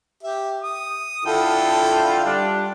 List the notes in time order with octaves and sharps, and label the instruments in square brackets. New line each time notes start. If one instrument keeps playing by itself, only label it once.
[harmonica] G4 E5
D#6
[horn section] D3 F4 [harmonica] E4 A4 G5
[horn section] G3 D4